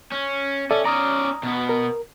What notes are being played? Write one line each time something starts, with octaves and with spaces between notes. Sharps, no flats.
C#4
C#4 A4 D5 E5
C#4 D5 A#5 D#6
B2 B3
A#4